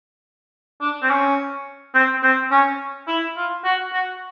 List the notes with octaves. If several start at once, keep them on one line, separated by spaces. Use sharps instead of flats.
D4
C4
C#4
C4
C4
C#4
E4
F4
F#4
F#4